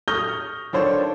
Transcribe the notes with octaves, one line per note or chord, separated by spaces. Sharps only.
C#6 D#6 F6 G6 A#6 G7
D#3 D4 F4 A4 C5 C#5